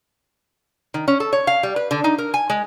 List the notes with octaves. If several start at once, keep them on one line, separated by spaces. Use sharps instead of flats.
D#3
C#4
A4
C#5
F5
G3
B4
D3
D#4
A#4
G#5
G#3